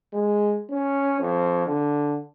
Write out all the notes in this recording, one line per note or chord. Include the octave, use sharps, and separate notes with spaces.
G#3
C#4
F2
D3